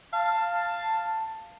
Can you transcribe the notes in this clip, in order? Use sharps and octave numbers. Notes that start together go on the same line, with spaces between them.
F5 A5